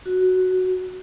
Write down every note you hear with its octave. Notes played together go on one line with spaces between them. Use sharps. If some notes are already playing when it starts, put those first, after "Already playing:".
F#4